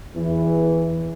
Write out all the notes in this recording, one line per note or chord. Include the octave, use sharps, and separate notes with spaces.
E2 E3